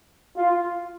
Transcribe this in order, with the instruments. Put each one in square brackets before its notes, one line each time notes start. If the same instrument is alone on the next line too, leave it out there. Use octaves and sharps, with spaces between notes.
[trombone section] F4